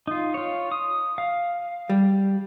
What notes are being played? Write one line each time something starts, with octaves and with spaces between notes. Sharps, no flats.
D#4 F4
F4 C#5
D#6
F5
G3